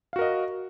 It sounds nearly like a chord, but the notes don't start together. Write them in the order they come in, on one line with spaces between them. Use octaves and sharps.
F5 F#4 A#4 D#5